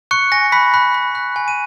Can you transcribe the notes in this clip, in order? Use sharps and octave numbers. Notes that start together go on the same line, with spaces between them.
C#6 F#6 C#7
G#5 A#6
B5 F#6 B6
B5 F#6 B6
B5
F#6
G#5
D#7